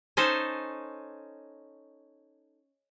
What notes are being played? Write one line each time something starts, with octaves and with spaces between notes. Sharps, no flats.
C#4 D#4 A4 C5